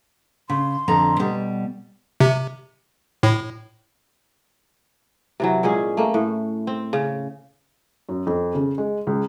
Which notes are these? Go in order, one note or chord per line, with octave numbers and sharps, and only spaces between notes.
C#3 C6
F2 D3 A#5
B2 G3
C3
A2
C3 E3 F#3
A#2 G#3 C#4 G#4
A3 A#3
A2
C4
C#3
F#2
F2
C#3
G#3
C#2